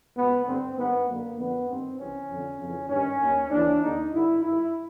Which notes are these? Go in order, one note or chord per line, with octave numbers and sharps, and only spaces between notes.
C#2 B2 B3
G2 D3 C4
G2 D#3 B3
F#2 D3 A#3
F2 D3 B3
G2 D#3 C4
C2 C3 E3 C#4
F2 D3
F2 C#3 E3
G2 D#3 C#4
D#2 D#3
D#2 C#3 E3 D4
D#2 D3 D#4
G2 D3 E4
G2 D#3 E4